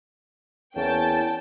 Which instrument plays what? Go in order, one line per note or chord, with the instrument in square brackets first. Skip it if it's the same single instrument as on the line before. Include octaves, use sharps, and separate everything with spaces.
[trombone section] E2 A#3 C#4 [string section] G5 A5